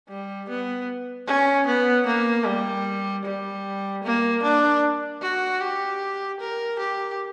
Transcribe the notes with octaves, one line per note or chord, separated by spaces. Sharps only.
G3
B3
C#4
B3
A#3
G3
G3
A#3
D4
F#4
G4
A#4
G4